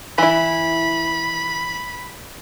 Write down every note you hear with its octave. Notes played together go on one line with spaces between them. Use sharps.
E3 E4 B5